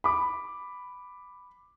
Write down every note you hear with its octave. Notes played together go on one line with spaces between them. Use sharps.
B5 D6